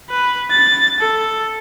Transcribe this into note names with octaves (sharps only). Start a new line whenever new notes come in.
B4
A6
A4